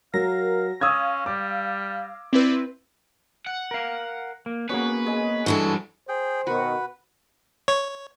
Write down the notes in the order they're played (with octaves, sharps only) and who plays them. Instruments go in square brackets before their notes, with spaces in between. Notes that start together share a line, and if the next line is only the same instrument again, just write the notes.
[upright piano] F#3 [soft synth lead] A#4 [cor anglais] F5 [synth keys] A#6
[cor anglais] C#4 [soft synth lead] F5 [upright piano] D#6 E6 G#6
[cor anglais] G3 [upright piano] D6
[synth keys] C4 E4 B4 [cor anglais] D5
[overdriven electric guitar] F#5
[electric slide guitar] A#4 F5
A#3
[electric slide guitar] A#3 B3 [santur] C#4 F#4 G#4 [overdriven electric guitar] B4
[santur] G#3 G#4
[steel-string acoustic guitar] G2 E3 A4 [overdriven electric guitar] F#3 G#3 [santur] F#4
[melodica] G#4 G5 [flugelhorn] C5
[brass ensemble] B2 D#3 [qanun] F#4 [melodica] B4
[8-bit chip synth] C#5